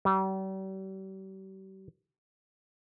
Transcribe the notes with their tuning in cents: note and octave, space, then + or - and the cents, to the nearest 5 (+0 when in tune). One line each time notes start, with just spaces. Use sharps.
G3 -40